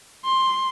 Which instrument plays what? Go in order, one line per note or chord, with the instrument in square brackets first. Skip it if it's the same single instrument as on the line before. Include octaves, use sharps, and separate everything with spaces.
[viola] C6